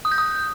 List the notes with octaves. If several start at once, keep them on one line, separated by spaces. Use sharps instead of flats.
D#6
G6
D#6